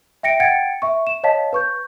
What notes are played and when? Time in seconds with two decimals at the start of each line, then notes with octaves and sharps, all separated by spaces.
0.23 E5 G5 A#6 C#7 D7
0.40 F#5 G5 G#6 A6 C#7 D7
0.82 E5 C#6
1.07 E7
1.23 C#5 D#5 F5 A5 B6
1.53 B4 C#6 G6